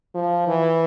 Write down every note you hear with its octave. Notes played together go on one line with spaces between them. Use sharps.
F3
E3